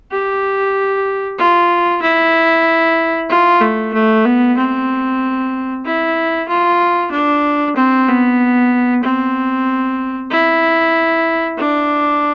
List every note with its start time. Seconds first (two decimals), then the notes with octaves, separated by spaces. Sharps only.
0.11 G4
1.38 F4
2.02 E4
3.29 F4
3.61 A3
3.93 A3
4.25 B3
4.57 C4
5.85 E4
6.48 F4
7.11 D4
7.76 C4
8.08 B3
9.02 C4
10.30 E4
11.58 D4